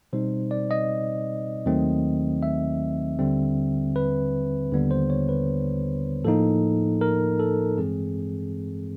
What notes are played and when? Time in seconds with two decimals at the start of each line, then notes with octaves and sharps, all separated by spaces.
0.13 B2 G3 C4 D#4 C5
0.51 D5
0.71 D#5
1.66 D#2 D#3 F#3 A3 C4
2.43 E5
3.19 D#2 D3 G3 C4
3.96 B4
4.71 D#2 D3 G3 B3 D4
4.91 C5
5.10 C#5
5.29 B4
6.24 A2 F3 A#3 D#4 A4
7.01 A#4
7.40 A4
7.78 G2 E3 G#3 C4 G#4